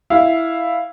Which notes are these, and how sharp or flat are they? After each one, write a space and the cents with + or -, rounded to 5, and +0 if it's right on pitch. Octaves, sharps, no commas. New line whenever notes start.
E4 +0 F5 +0